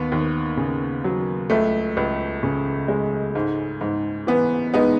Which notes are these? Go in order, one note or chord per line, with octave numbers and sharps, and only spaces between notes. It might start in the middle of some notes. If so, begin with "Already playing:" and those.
Already playing: D#2 B3
D#2
C#3
F#3
C#2 A3
C#2
C#3
G#3
G#2
G#2
E3 B3
G#3 B3 D#4